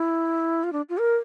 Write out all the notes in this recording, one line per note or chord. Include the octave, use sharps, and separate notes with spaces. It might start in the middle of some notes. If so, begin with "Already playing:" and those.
Already playing: E4
F4
D4
F4
A#4